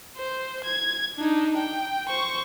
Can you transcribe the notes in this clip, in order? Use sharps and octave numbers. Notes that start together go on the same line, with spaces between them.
C5
G#6
D4 D#4
G5
C5 C#6